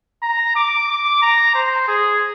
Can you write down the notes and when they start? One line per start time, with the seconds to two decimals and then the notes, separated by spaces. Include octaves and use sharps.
0.22 A#5
0.56 D6
0.88 D6
1.22 A#5
1.55 C5
1.88 G#4